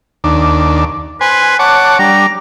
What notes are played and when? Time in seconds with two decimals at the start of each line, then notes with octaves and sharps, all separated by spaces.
0.24 D#2 D4
1.21 B4 C5 G#5
1.59 C#5 F#5 A5 D6
1.99 G3 D4 A#5